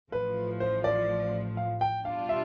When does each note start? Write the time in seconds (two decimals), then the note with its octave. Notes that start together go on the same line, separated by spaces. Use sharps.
0.12 A1 A2 F3 B4
0.60 C5
0.84 D5
1.57 F5
1.81 G5
2.05 B2 G3 D4 F4 F5
2.29 E5